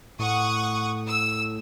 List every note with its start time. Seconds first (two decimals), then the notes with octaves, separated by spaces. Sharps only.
0.19 A2 F#5 C#6 D#6
1.06 E6